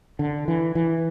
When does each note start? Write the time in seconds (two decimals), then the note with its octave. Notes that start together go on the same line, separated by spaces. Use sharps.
0.19 D3
0.48 E3
0.75 E3